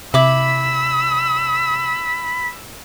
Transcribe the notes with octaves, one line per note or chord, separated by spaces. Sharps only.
C3 E4 B5 D6 E6